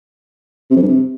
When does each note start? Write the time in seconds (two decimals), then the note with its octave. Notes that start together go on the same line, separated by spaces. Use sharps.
0.70 C3
0.76 F2
0.82 G2
0.88 C3